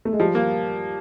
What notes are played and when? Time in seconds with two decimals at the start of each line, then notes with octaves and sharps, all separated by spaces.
0.05 A3
0.13 G#3
0.20 F3 G3
0.35 A#3